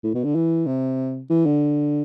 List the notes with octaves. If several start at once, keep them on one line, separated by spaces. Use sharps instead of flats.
A2
B2
D3
E3
C3
E3
D3